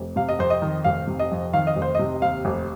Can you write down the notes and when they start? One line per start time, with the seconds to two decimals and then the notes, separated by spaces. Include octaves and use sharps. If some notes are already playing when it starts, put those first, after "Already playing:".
Already playing: F1
0.16 C3 F5
0.29 D#5
0.39 F2 C5
0.50 D#5
0.62 D#3
0.84 F1 F5
1.07 C3
1.19 D#5
1.31 F2
1.53 D#3 F5
1.67 D#5
1.76 F1
1.82 C5
1.95 C3 D#5
2.22 D#2 F5
2.45 F1